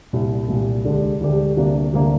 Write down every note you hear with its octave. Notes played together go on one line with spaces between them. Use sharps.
C2 A#2 G3
C2 A#2 G3
D2 D3 G#3 D4 G4
D2 D3 G#3 D4 G4
D2 C3 G3 A#3 D4
D2 C3 G3 A#3 D4